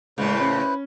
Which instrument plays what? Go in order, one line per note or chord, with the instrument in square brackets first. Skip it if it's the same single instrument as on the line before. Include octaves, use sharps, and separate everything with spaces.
[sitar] A2 C#3 [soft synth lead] G#3 [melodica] E4 B4 C5
[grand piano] C#4 [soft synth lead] B5